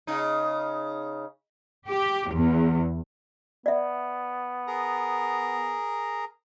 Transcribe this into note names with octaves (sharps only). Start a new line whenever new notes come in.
C#3 D#4
G4
E2
B3 D5 E5
G#4 A#4 A#5